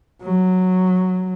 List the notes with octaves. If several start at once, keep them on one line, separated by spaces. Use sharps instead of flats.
F#3